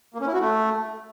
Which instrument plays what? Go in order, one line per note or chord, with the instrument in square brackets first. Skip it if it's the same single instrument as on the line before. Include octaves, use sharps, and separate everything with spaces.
[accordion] A#3
C#4
E4
F#4
A3